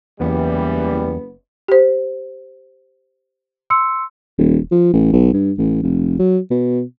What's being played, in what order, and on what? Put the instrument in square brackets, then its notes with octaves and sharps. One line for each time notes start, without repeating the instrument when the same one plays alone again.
[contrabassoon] F#1 [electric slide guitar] E2 [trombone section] E3 G3 [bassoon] B3
[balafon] G4 C5
[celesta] C6 E6 C#7
[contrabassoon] D#1
F3
A1
B1
G2
A1
F1
F#3
B2